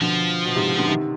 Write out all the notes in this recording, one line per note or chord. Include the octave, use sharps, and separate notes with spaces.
B2 D3 F3
B2
G#2 C3
B2 D3
C3 D#3